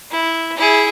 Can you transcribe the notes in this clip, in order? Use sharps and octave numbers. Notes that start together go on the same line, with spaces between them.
E4
E4 G#4